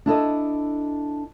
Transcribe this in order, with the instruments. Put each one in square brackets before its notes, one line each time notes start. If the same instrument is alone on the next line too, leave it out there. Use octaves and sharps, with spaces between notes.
[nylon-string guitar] D4 E4 A4 D#5